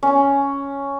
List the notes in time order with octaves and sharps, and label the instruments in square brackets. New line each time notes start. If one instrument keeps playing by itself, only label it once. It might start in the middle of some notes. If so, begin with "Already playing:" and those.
[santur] C#4